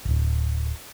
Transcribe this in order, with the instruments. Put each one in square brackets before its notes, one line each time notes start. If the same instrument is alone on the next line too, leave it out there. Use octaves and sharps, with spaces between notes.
[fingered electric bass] D1 G1